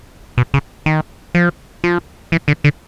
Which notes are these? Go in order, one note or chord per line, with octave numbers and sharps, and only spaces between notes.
B2
C#3
D#3
F3
F3
E3
D3
D3